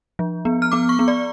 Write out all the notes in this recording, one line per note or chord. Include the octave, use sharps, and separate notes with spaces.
F3
B3
F6
B3 D6
C#6
B3
D5